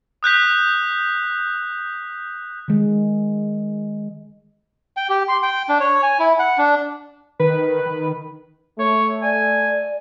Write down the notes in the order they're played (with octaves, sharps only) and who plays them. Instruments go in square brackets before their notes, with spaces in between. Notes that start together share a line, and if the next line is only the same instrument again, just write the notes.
[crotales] D#6 F#6 G6 B6
[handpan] D#3 G#3
[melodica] G5
G4
C6
G5
D4
C#5
G#5
E4
F#5
D4
[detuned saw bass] D#3 [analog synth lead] B4
[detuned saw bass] D#3
[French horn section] A3 [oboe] C#5
[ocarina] D5 [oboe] G#5